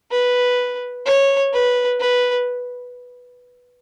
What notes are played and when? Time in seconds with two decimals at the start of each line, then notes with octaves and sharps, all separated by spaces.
0.11 B4
1.05 C#5
1.53 B4
2.00 B4